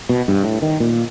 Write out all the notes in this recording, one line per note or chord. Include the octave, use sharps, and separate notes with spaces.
B2
G2
A2
D#3
A#2